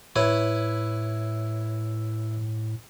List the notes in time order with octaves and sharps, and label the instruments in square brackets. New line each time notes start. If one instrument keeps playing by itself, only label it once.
[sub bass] A2 [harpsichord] E4 B4 C#5